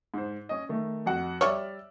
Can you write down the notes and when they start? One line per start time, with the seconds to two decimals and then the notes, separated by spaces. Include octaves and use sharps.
0.14 G#2 C5
0.49 C#4 D#5
0.69 D#3 A3
1.06 F2 F#4 F#5
1.41 G3 C#5 D5 E5 F6